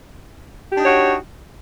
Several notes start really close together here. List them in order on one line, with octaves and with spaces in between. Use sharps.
G4 D4 D#4 C#5 F#4